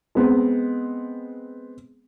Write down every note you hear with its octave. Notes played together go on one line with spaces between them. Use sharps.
G#3 B3 C4